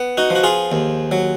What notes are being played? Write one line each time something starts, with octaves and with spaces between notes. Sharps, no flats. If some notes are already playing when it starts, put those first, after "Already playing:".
Already playing: B3
D#4 F#4
F3
F#4
F4 G#4
D#2
F#3